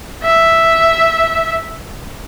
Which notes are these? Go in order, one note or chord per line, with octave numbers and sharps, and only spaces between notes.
E5